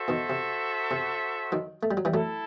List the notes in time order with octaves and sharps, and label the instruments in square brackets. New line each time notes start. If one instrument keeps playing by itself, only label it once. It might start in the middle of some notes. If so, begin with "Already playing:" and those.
Already playing: [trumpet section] F#4 A4 C5 E5
[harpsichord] B2 D#3
C3
C3
D#3 F#3
A3
G3
F#3
E3 G3
[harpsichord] F#3 A3 [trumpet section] E4 A4